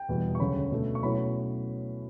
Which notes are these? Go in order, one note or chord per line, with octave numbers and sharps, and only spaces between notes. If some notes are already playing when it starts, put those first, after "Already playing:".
Already playing: G5
E2 B2 G3
C#6
D2 C#3 F#3 C#4 B5
B2 A3 D4
C#6
B2 F#3 A3 C#4 E4 B5